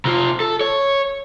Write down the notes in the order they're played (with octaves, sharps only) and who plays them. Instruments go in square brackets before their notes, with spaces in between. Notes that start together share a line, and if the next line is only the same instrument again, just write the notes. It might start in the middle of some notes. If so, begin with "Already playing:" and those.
[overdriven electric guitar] C3 F4
A4
C#5